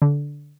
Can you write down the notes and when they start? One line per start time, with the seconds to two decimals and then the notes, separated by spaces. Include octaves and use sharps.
0.02 D3